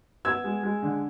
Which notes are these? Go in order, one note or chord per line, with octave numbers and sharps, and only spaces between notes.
B3 E6 G#6
G#3
G#3
D3